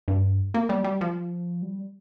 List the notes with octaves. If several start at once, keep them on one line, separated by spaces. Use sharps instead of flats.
G2
A#3
G3
G3
F3
G3